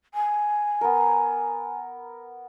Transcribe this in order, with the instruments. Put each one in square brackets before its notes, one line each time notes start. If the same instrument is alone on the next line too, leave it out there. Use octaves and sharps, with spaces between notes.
[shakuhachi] G#5
[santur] B3 A#4